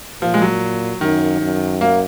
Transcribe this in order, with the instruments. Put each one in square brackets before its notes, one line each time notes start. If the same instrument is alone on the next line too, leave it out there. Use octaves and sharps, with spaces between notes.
[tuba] A#2 [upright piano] F3
[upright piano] G#3
F#3
[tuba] F#2 [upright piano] D#3
[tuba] F#2
[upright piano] A#3